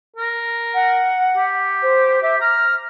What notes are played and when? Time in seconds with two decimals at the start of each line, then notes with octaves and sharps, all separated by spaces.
0.17 A#4
0.74 F#5
1.36 G4
1.83 C5
2.23 G4 E5
2.41 A#5 F6